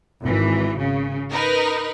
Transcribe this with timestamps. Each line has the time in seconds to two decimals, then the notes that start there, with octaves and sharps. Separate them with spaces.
0.23 G#1 E3
0.80 C#3
1.31 D#4 A#4 B4